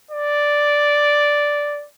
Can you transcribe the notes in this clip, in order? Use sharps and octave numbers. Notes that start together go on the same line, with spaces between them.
D5